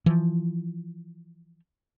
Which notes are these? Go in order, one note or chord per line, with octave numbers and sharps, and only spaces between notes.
E3 F3